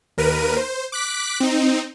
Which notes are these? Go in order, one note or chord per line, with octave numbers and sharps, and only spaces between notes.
D#2 A#4 B4 D#7
C5
D6 F#6 B6
C4 D#4